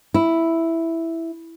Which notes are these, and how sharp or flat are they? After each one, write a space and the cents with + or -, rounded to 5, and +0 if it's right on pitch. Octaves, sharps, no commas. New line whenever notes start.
E4 +0